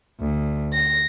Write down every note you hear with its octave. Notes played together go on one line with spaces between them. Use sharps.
D2
A#6